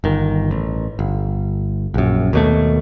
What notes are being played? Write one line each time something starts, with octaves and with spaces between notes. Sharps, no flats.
G1 D#3
A1
G1
A#1 F#2
D#2 B2 A3